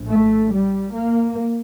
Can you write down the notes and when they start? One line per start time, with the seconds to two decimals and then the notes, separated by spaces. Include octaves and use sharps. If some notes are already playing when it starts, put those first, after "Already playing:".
Already playing: A#1 A2
0.09 A3
0.51 G3
0.92 A#3